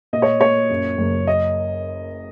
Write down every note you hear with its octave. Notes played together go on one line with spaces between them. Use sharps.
A#2 D#5
C#5
A#2 C#5
F#2
F#1
D#5